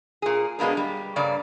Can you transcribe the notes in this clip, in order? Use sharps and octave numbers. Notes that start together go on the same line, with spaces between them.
A#2 G#4
B2 G#3 A#3 B3 D4
G3
G2 C#3 A#3 D5